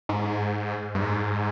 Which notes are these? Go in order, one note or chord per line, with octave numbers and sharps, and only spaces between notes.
G#2
G2
G#2